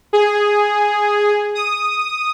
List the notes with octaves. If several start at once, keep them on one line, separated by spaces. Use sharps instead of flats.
G#4
D#6